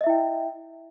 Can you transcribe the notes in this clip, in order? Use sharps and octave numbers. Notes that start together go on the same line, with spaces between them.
E4 D#5 E5 G5